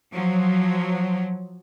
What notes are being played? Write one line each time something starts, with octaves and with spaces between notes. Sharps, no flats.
F3 F#3